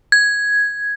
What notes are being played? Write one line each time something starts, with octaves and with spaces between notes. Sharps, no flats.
G#6